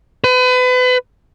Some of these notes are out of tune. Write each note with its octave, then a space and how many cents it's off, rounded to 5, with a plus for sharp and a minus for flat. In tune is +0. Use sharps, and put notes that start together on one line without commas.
B4 +35